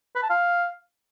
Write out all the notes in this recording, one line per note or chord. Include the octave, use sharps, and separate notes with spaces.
B4
A5
F5